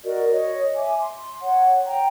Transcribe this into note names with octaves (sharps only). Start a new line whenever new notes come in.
F#4 A#4 D5 D#5
C#5 D#5
E5 G#5 D6
C6
C#5 F#5
G5 A#5